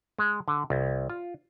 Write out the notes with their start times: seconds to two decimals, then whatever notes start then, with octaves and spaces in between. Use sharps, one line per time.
0.19 G#3
0.48 D3
0.70 C2
1.10 F4